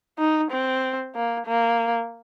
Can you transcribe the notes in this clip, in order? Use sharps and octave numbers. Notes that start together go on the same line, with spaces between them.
D#4
C4
A#3
A#3